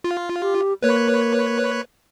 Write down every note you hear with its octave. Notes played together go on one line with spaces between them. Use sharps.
F4
G4
A#3 B4 C#5 F#6